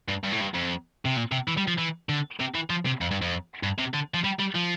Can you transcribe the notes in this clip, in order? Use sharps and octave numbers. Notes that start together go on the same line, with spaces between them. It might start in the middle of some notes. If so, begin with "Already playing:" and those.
G2
G2
A2
G2
F2
C3
A#2
C3
E3
G3
F3
E3
D3
C3
E3
F3
C3
F2
G2
F2
G2
C3
D3
F3
G3
G3
F3